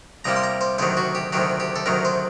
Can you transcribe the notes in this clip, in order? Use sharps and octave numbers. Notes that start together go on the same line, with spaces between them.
C2 C3 G3 A#3 A#5
C6
A#5
C5
D2 C3 D#3 F#3 C5
F#4
G4
D2 C3 D#3 F#3 G4
G4
A4
D2 C3 D#3 F#3 A#4
C5